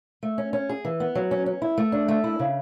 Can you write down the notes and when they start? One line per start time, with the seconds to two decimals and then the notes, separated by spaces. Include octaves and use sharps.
0.23 A3
0.38 C#4
0.53 C#4
0.69 G#4
0.85 E3
1.00 B3
1.15 F#3
1.31 C#4
1.46 C#4
1.62 E4
1.78 A3
1.92 D4
2.08 A3
2.24 E4
2.39 C#3